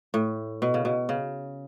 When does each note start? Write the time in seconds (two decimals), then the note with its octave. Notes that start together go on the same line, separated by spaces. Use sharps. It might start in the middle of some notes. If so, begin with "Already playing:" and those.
0.14 A2
0.62 B2
0.74 C#3
0.85 B2
1.09 C#3